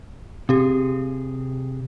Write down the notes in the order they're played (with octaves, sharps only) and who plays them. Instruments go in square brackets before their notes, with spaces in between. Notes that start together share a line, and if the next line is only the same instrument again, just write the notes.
[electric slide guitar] C3 G#4 [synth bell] C4 G4